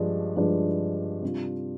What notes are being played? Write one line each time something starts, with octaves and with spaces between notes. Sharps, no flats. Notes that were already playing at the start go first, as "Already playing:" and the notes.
Already playing: G2 F3 G#3 D4
G2 F3 G#3 D4
C3 G3 D4 F4